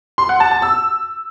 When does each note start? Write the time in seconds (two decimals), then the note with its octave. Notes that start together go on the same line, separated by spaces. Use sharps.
0.18 C6
0.29 F#5
0.40 A5
0.51 A5
0.62 E6